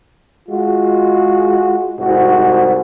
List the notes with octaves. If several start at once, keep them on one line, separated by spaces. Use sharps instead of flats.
G#3 F4 F#4
C2 G#2 F#4